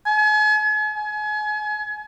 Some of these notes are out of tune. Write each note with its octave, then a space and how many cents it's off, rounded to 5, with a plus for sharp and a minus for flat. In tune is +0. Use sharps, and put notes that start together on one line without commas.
G#5 +40
G#5 +35